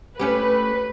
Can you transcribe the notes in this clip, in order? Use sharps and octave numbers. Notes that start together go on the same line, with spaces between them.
A3 C#4 G4 B4